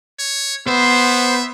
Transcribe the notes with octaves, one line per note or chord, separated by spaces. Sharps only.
C#5
B3 C5 E5